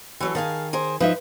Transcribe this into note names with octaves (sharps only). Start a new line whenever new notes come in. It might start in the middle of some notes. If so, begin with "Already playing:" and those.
E3 F#3 A4
D#3 G#4 F5 A5
G#4 A#4 C5
F3 D#4 B4 E5